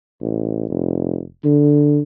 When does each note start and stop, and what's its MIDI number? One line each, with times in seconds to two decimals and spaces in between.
0.21 0.65 33
0.70 1.23 29
1.45 2.01 50